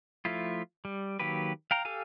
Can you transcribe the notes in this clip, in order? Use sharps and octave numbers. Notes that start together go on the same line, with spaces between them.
F3 A3 E4 F4
G3
D#3 F#3 A#3 G4 B4
F5 G5 A#5
G4 A4 F5 G#5